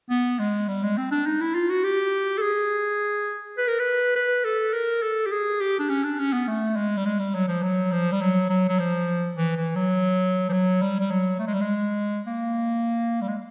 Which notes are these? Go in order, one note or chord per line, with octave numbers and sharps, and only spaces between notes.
B3
G#3
G3
G#3
C4
D4
D#4
E4
F4
F#4
G4
A4
G#4
B4
A#4
B4
B4
A4
A#4
A4
G4
G#4
G4
D4
C#4
D4
C#4
B3
A3
G#3
G3
G#3
G3
F#3
F3
F#3
F3
G3
F#3
F#3
F#3
F3
E3
E3
F#3
F3
F#3
G3
G3
F#3
A3
G#3
G3
G#3
A#3
G3
G#3